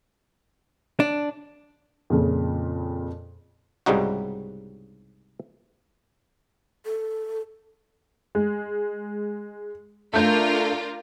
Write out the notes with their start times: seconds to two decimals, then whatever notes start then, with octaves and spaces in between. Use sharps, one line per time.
1.00 D4
2.10 F2 A#2 C#3
3.86 C2 G#2 C#3 G3 D#4 F#4
6.85 A4
8.35 G#3
10.13 A3 D4 F4 A#4 G6